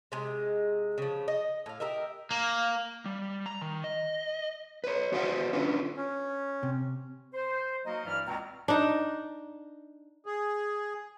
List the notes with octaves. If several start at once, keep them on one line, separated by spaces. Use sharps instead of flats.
C3 G#3
C#3 F3
D#5
A2 F5
G4 A#4 D#5 E5
A#3
G3
A#5
D#3
D#5
B4 C#5
F#4 B4 C5 F5 F#5
C#4 D4 F4 B4
C#4
C3
C5
F#3 A#3 D#4 F#4 D#5
G2 E3 E4 D5 F6
C#2 B2 C4 A#5
D4 D#4
G#4